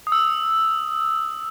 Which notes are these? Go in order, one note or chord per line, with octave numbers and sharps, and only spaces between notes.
D#6
E6